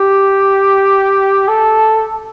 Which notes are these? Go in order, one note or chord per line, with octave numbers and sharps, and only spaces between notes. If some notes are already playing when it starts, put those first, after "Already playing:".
Already playing: G4
A4